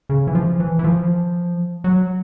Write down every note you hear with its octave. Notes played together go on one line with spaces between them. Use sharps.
C#3
E3
F3
E3
E3
F3
F#3